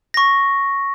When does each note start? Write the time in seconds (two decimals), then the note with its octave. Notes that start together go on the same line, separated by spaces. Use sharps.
0.14 C#6 A#6